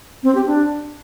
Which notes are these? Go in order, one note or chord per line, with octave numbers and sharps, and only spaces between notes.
C4
G4
D4